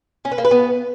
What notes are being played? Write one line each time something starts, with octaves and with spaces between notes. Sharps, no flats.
C#4
B4
A#3
B4
B3